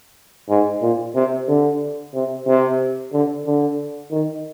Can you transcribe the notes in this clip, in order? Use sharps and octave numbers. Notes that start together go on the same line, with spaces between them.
G#2
A#2
C3
D3
C3
C3
D3
D3
D#3